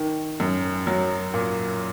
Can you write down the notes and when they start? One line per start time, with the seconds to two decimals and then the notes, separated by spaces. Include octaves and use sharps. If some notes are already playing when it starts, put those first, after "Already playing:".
Already playing: D#3
0.40 F#2
0.87 F#3
1.34 A#2